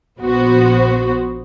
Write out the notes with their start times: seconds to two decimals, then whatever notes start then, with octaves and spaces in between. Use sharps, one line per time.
0.19 A#1 B3 F#4 C5